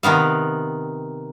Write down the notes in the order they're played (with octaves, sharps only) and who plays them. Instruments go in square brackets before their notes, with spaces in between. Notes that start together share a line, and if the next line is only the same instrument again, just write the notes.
[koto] C3 D#3 B3 F5